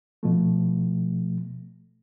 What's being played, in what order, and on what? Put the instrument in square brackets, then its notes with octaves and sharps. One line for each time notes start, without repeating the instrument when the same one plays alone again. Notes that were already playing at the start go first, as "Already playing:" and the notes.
[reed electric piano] B2 F3 A3